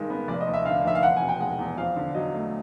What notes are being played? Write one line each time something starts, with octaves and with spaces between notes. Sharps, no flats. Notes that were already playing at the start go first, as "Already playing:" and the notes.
Already playing: G2 D#3 G#3
B3
F1 D5
D#5
D#2
E5
D3 F5
F1 E5
F5
E2 F#5
G#5
B2
G5
G#3 F#5
E2
F2 F5
D3
F#3 D#5
A3